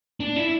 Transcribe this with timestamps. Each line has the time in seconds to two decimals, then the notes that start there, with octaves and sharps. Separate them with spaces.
0.20 D4
0.36 E4